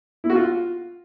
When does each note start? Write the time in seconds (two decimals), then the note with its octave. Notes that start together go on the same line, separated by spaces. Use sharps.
0.24 E4
0.30 F#4
0.35 F4